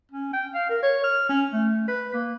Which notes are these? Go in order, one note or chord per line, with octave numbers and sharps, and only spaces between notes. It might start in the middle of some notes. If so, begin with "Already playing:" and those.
C#4
G5
F5
A#4
C#5
F6
C#4
A3
B4
A#3